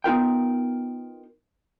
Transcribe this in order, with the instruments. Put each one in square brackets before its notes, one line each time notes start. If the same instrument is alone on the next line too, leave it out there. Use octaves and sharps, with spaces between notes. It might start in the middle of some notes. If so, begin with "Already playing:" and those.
[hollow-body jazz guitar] B3 D#4 F4 A#4 G5